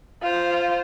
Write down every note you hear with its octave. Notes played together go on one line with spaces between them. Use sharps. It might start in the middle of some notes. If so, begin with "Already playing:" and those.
F4 C5